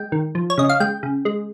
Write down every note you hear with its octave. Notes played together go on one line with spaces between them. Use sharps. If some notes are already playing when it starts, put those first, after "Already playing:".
Already playing: G#3 G5
D#3
F3
C#5
C#3 D#5
F5
G#3 G5
C#3
G#3